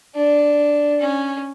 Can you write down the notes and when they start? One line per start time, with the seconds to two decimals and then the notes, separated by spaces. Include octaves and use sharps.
0.15 D4
1.00 C#4